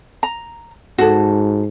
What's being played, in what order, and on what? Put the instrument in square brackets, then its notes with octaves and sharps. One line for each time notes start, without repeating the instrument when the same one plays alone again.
[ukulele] A#5
[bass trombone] G#2 [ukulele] F#4 A4